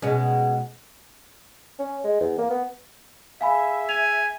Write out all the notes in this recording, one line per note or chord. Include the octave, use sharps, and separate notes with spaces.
B2 G#3 C#4
C#4
G#3
E2
A#3
B3
G#4 E5 F5 G#5 B5
G#5 F7